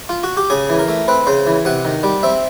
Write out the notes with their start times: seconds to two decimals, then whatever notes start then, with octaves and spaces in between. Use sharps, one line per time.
0.09 F4
0.23 F#4
0.37 G4
0.50 C#3 G#4
0.70 E3
0.79 A#4
0.88 A3
1.08 C4 B4
1.27 C#3 C5
1.47 E3
1.65 C3 F#5
1.85 D#3
2.03 G3
2.23 C4 E5